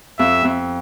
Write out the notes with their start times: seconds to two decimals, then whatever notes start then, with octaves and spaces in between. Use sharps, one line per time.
0.19 F2 E5
0.44 F2